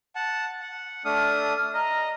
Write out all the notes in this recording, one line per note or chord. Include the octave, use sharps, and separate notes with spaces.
F#5 A5
F#5
A3 D4 D#6 F6
D#5 A#5